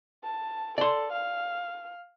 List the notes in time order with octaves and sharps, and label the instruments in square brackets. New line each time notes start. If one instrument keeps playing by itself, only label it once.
[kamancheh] A5
[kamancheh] A4 [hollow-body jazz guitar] D5 C6
[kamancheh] F5